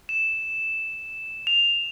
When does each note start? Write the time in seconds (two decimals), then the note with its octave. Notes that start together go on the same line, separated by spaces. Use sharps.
0.09 E7
1.47 F7